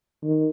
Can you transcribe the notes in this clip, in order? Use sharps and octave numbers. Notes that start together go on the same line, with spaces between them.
D#3